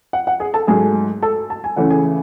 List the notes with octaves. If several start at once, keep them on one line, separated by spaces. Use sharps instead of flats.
F#5
F#5
G#4 G#5
A4 A5
G#2 F#3 A3 G#4 G#5
A4 A5
A5
G#5
C#3 E3 A3 C#4 F#5
G#4 G#5